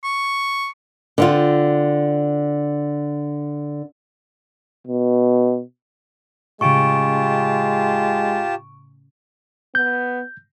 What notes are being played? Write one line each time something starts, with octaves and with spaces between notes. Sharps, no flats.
C#6
D3 C4 F4
B2
A2 C#3 G#3 F4 G4 A5 C#6 D7
B3 G6